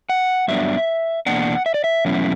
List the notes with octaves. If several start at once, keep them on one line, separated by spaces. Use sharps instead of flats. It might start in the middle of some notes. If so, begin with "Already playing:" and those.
F#5
G2 F#3 B3 D4 E5
E2 B2 A#3 D4 F#5
E5
D5
E5
E2 B2 F#3 C#4 E4